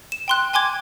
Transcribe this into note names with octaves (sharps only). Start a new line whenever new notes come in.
E7
G5 C6 F#6
G5 G#5 C6 D6 G#6